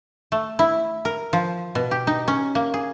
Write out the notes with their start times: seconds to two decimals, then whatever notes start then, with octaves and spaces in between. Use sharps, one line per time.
0.32 A3
0.59 E4
1.05 A#4
1.33 F3
1.75 B2
1.91 G4
2.07 D#4
2.28 C#4
2.55 A#3
2.74 G#4